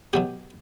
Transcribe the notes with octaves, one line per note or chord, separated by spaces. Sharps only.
B2 F#3 B3 G4